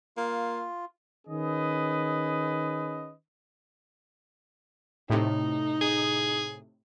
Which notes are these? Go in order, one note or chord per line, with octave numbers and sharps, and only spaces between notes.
A#3 F4
D#3 C#4 G#4 B4 D#5
A2 C3 D#4
G#4